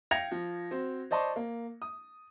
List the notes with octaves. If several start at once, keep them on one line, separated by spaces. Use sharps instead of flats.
F5 G5 G#6 A#6 C#7 F7
F3
C4 F#4 C5
C5 D5 D#5 A5 C6 C#6
A#3
D#6